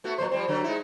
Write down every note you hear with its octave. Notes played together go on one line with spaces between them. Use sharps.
A3 B3 F#4
A#2 F#3 C5
F3 G3 C4
D3 F#3 G3
G#3 D#4 E4